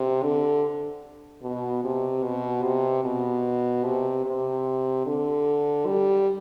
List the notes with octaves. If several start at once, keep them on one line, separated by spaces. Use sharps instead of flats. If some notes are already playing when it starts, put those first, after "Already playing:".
Already playing: C3
D3
B2
C3
B2
C3
B2
C3
C3
D3
G3